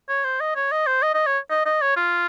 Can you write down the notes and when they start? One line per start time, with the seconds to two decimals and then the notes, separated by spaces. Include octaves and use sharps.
0.09 C#5
0.24 C5
0.40 D#5
0.55 C#5
0.71 D#5
0.87 C5
1.02 D#5
1.14 D#5
1.26 C#5
1.50 D#5
1.65 D#5
1.81 C#5
1.96 F4